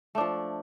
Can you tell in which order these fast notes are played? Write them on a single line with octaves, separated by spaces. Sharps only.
A3 D4 F3